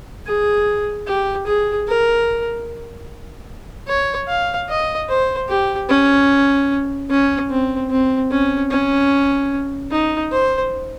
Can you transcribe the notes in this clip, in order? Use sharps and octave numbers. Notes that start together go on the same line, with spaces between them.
G#4
G4
G#4
A#4
C#5
F5
D#5
C5
G4
C#4
C#4
C4
C4
C#4
C#4
D#4
C5